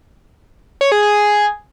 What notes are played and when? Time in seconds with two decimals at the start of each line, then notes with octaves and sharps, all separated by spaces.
0.81 C#5
0.92 G#4
1.03 G#4